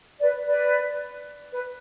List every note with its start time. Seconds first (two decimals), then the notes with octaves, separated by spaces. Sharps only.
0.19 B4 D5
0.46 B4 D5
1.52 B4